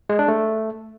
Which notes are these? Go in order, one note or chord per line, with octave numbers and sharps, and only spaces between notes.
G#3
D4
A3